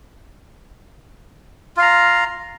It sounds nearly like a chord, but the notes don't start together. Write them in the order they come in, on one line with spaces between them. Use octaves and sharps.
F4 F5 A#5